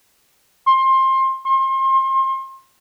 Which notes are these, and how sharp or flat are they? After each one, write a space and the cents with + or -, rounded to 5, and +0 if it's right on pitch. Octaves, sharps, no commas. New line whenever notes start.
C6 +20
C6 +30